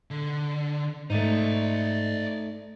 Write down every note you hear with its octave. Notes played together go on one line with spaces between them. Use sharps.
D3
G#2 A3 D#4 C5 D5